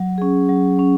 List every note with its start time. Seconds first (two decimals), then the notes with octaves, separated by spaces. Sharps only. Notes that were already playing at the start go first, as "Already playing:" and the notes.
Already playing: F#3
0.18 C#4 G#4
0.49 F#3
0.79 C#4